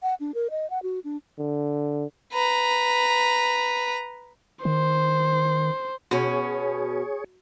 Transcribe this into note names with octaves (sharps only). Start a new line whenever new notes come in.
F#5
D4
A#4
D#5
F#5
F#4
D4
D3
B4 A#5
D#3 C5
B2 C#4 F#4 G#4 C#5